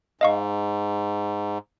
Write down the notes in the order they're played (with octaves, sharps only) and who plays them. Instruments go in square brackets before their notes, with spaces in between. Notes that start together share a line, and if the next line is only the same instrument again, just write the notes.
[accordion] G#2 [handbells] D#5 F5 C#6